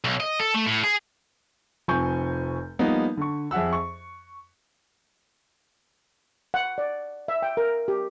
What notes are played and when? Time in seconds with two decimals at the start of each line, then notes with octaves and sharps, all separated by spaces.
0.04 B1
0.20 D#5
0.39 A4
0.54 A3
0.67 A2
0.84 G#4
1.88 F1 F3 C4 G#5 C#6 G6
2.79 F3 G3 A#3 B3 D#4
3.17 D3 C#6
3.51 F2 G#4 E5 F#5 E6
3.72 C#6
6.54 F#5
6.78 D5
7.28 E5
7.42 G5
7.57 A#4
7.88 G4